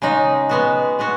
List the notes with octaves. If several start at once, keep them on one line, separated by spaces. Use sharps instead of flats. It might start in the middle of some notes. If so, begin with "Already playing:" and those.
C#3 G#3 D#4
G#3 B3 F#4
G#3 B3 F#4